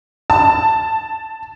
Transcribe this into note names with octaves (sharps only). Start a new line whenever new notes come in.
A5